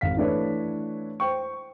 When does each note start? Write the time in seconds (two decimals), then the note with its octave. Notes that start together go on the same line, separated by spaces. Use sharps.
0.01 G#1 F5 B6
0.17 E3 A3 D4 E4 B4 C#5
1.20 C5 G5 C#6